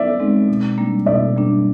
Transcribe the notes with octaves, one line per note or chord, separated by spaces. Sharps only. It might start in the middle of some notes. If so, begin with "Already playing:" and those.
Already playing: D5 E5
G#3 C4 D#4
B2
G3 A#3 D4
B2 D5 E5
G3 A#3 D4